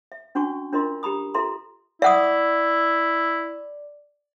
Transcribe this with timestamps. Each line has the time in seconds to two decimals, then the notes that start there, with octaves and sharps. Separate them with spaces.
0.12 E5
0.35 C#4 D4 F#4 G#5 C#6
0.73 D4 F4 A#4 D#5 C6
1.03 G4 A#5 B5 D#6
1.34 F4 A4 E5 A#5 C6
2.02 E4 D5 E5 F#5 D#6